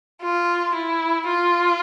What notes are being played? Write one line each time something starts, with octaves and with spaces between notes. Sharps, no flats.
F4
E4
F4